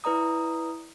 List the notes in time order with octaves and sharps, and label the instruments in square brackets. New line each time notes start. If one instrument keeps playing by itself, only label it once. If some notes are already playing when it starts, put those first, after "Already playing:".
[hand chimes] E4 B4 D5 A#5 D#6